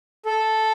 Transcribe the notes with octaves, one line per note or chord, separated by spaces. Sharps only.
A4